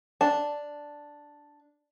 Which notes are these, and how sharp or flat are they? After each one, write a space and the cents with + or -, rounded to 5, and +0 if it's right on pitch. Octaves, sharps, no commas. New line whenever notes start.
D4 +0 A5 +0